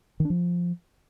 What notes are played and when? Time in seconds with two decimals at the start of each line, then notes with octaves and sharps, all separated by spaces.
0.20 D#3
0.25 D4
0.30 F3